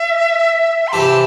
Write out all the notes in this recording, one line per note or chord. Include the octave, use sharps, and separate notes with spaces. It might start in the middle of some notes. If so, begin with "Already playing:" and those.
Already playing: E5
C6
C3 E3 C4 G4 A5